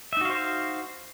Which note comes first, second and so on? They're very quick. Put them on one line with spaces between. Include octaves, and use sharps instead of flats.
E5 D#4 F#4 F5 C5